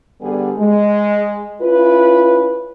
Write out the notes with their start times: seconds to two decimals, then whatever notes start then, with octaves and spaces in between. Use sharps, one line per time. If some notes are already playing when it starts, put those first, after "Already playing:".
0.21 D3 G3 B3 G#4
0.58 G#3
1.61 C#4 E4 F4 B4